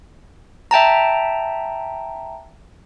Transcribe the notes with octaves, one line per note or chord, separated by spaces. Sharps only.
E5 G5 A5 A#5